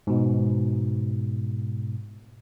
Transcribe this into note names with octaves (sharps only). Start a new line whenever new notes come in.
G#2 B2